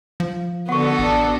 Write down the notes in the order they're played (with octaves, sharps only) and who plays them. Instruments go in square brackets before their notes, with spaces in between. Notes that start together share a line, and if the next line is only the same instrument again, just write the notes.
[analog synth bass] F3 [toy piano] F5
[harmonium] D3 [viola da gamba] B3 F#4 A4 [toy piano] F#5 C#6
[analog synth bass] A1 [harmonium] D4 [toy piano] D6